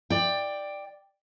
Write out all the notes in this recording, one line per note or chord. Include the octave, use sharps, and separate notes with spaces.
D5 G5